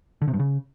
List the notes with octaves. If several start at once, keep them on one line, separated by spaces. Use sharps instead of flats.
D3
C3
G2
C#3